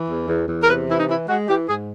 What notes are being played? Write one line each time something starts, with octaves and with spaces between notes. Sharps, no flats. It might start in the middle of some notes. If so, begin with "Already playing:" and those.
Already playing: E3
E2
E2
E2
A#4
C3 B4
E3 E4
D#4
E3 E4
G#3 F#4
E3 G4
G#2 G#4